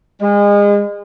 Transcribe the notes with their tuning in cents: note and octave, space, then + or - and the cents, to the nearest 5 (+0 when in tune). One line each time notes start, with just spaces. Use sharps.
G#3 -30